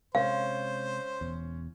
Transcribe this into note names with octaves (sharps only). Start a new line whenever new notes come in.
C3 G#3 C#4 C5 F5
E1 E2